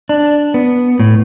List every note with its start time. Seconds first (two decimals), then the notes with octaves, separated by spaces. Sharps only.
0.09 D4
0.54 B3
0.99 A2